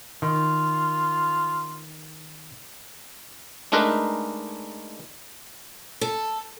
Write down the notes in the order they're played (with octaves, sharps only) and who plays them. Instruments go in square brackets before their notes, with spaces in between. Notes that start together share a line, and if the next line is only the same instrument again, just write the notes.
[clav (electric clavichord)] D#3 [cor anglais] F4
[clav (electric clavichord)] G#3 A3 D4 D#4 A#4 B4
[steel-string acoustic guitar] A4